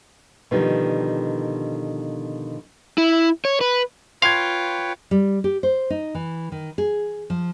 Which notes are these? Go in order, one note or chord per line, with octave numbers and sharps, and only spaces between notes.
B2 D3 D#3 F3 G3
E4
C#5
B4
F4 B4 C#5 F5 G5 C6 G#6
G3
G4
C5
D#4
E3
D#3
G#4
F3